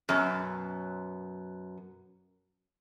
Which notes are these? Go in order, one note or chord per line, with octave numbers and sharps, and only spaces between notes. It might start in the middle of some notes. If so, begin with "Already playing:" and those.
F#2 B2